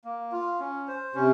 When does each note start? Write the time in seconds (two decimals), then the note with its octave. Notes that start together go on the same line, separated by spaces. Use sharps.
0.04 A#3
0.32 F4
0.60 C#4
0.88 C5
1.15 C3 C#4